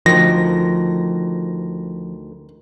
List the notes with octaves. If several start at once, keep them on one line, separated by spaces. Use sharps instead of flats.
D2 D#3 F3 A#6